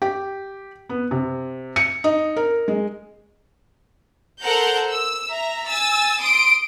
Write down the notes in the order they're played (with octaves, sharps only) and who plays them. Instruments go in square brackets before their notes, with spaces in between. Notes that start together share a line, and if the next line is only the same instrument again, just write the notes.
[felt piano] G4
B3
C3
C#7
D#4
A#4
G#3
[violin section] A4 A#4 C5 F#5 A#5 G6
E6
E5 A#5
G#5 E6 A6
C6 D#6 D7